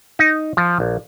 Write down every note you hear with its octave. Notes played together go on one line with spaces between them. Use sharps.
D#4
F3
A#1